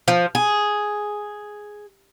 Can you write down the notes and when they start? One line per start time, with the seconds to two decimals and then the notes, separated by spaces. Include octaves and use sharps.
0.08 F3
0.35 G#4